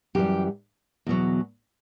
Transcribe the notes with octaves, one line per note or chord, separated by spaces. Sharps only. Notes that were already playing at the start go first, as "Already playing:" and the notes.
F#2 E3 G3 G4
E2 B2 F#3